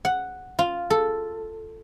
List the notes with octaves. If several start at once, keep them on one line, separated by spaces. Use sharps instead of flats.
F#5
F4
A4